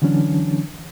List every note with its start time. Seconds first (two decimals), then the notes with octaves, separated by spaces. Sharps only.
0.02 D3 E3 F#3 C#4 D4